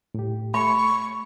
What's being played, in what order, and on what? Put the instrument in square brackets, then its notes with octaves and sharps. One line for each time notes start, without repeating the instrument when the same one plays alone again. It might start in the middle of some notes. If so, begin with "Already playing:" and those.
[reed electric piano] A2 G4
[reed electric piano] A3 [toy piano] B5 [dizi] C#6